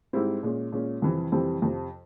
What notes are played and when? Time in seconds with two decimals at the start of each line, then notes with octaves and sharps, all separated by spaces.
0.13 G#2 G3 C4 E4
0.43 A#2 G#3 C#4
0.72 A#2 G#3 C#4
1.02 F2 C3 E3 G3 C4
1.32 F2 C3 E3 G3 C4
1.62 F2 C3 F3